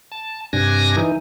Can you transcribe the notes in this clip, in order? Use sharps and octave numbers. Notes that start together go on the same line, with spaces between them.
A5
G2 C3 D4 G#5 A#6
E3 D#4